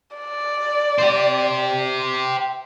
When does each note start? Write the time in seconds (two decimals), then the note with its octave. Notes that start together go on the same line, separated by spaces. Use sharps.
0.17 D5
0.98 G4 C5